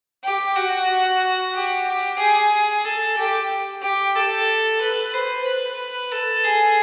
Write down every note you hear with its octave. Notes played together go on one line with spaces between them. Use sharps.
G4
F#4
G4
G4
G#4
A4
G4
G4
A4
B4
C5
B4
A4
G#4